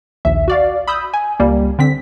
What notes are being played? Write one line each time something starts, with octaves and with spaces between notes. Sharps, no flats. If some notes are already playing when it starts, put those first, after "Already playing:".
A#1 D#2 E5
F#4 D5 F5
B5 D#6 E6 G6
G#5
C#2 G3 A#3
D3 C4 B6